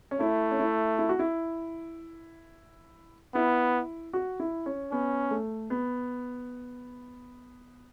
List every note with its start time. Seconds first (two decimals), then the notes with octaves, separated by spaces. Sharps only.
0.11 C#4
0.20 A3 E4
0.51 C#4
0.59 E4
0.99 E4
1.09 F#4
1.19 E4
3.34 B3 E4
4.13 F#4
4.40 E4
4.66 C#4
4.92 B3 C#4
5.31 A3
5.70 B3